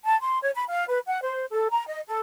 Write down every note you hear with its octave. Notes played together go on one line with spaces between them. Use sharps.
A5
C6
C#5
B5
F5
B4
F#5
C5
A4
A#5
D#5
A4